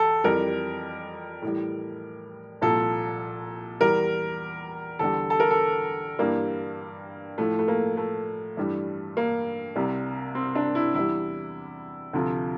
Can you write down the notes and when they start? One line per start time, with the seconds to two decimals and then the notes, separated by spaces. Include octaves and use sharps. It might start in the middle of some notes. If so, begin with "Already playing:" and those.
Already playing: E2 A4
0.24 F2 E3 G3 A#4
1.42 A2 E3 G3
2.61 C2 A#2 F3 A4
3.81 E2 E3 G3 A#4
4.99 E2 D3 G3 A4
5.30 A4
5.40 A#4
5.51 A4
6.19 G2 E3 G3 A#3
7.38 A2 F3 A3
7.59 A3
7.68 A#3
7.97 A3
8.57 G2 E3 G3
9.17 A#3
9.76 C2 C3 G3
10.35 C4
10.55 D4
10.75 E4
10.94 E2 E3 G3 E4
12.13 D2 C3 F3